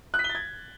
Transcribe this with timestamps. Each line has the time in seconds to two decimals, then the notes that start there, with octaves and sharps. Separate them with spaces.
0.14 F#6
0.19 B6
0.24 G7
0.29 A6
0.35 G#6